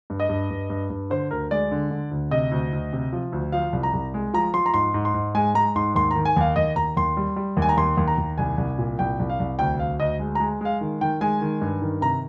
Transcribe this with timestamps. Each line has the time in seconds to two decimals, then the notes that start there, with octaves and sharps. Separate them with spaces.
0.10 G2
0.20 D#5
0.29 G2
0.50 G2
0.70 G2
0.90 G2
1.10 D3 C5
1.31 D2 A#4
1.51 G#3 D5
1.71 D3
1.91 D3
2.11 D2
2.31 C3 D#5
2.51 D2
2.73 D2
2.93 C3
3.13 F3
3.32 D2
3.52 F3 F5
3.73 C2
3.83 A#5
3.93 C2
4.14 G#3
4.33 F3 A#5
4.54 F3 C6
4.66 A#5
4.74 G#2 C6
4.94 G#2
5.05 C6
5.14 G#2
5.35 G#3 G#5
5.54 G#3 A#5
5.75 G#2 C6
5.95 D#2 C6
6.11 D#3 A#5
6.25 G#5
6.36 D#2 F5
6.56 D#2 D#5
6.76 D#2 A#5
6.97 D#2 C6
7.17 G3
7.36 G3
7.57 D#2
7.62 G#5
7.69 A#5
7.77 D#2 C6
7.97 D#2
8.08 A#5
8.18 D#2
8.38 C2 G#5
8.58 C2
8.78 A#2
8.99 C2 G5
9.19 C2
9.30 F5
9.40 C2
9.59 D2 G5
9.79 D2 F5
10.00 D2 D#5
10.19 G#3
10.35 G#3 A#5
10.61 G#3 F5
10.81 D#3
11.01 D#3 G5
11.21 G#3 G#5
11.41 D#3
11.61 G2
11.82 D#3
12.01 C3 A#5